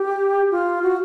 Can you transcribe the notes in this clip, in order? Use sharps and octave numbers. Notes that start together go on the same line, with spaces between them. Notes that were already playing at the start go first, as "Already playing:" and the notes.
Already playing: G4
F4
F#4